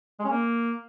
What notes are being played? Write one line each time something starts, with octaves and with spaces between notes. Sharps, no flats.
G#3
C#4
A#3